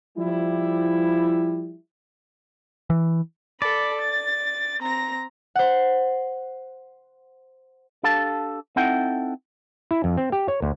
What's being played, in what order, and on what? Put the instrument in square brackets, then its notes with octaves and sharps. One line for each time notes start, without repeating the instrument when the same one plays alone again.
[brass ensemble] F3 G3 E4
[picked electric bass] E3
[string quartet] A4 B5 [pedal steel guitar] D5
[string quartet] A6
C4 A#5 A#6
[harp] C5 F#5
[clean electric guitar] D4 G4 A4 F5 A5
C4 D#4 E4 A4 F#5 G5
[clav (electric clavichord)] E4
F2
C4
G4
C#5
D2